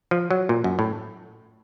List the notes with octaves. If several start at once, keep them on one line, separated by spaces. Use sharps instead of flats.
F3
F#3
A#2
F#2
A2